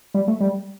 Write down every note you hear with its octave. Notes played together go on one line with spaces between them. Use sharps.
G3
A3
G3